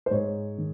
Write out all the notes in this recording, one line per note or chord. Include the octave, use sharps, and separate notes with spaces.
C5
G#2 C#5
D#3